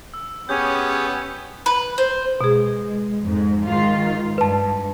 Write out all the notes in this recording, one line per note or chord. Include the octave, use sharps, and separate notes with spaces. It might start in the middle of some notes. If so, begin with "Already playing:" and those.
E6
B3 C#4 G4 G#4 C#5 G6
B4
C5
B2 G#3 G#4
F2 G#2
G#2 D#3 F4
G2 B4 A5